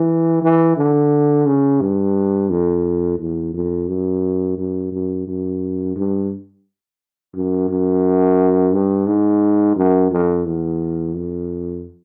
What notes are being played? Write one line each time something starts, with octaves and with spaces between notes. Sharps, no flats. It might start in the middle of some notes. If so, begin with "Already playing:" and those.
Already playing: E3
E3
D3
C#3
G2
F2
E2
F2
F#2
F#2
F#2
F#2
G2
F#2
F#2
G2
G#2
F#2
F2
E2
F2